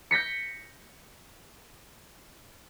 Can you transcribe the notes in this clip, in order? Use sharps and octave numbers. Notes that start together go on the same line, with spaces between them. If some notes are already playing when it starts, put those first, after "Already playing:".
G6 A#6 B6 C#7